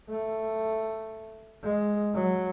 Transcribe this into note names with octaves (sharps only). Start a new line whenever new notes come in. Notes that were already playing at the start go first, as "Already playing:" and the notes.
A3
G#3
F#3